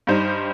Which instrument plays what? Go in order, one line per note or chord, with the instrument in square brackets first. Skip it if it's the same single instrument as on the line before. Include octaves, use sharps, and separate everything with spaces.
[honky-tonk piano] G2 G3 D#4 C5